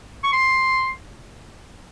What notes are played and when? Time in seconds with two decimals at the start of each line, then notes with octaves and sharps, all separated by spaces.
0.24 C#6
0.33 C6